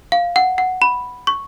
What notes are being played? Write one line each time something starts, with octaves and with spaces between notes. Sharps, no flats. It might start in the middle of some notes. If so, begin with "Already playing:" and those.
F5
F#5
F#5
B5
C#6